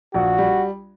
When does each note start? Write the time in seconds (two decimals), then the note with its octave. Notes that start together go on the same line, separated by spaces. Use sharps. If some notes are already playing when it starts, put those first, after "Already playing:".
0.14 A#1 F#4
0.38 G3